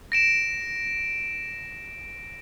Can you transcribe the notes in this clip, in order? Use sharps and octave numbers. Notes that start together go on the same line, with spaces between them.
A#6 D7 E7